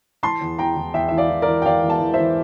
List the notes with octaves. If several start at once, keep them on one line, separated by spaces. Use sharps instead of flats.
E3 A5 C6
E2
E3 G5 A#5
E2
E2 E5 G5
E3 E5
D5 F5
E3
A#4 D5
E3
G5
E2 D5 F5
E2
F5 A5
E3
C5 E5
E3